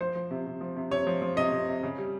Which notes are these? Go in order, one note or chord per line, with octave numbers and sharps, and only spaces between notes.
F3 C5
F3
C3
C3
F3
C3
C3 C#5
F3
F3
C3 D#5
C3
C3
C#3
G3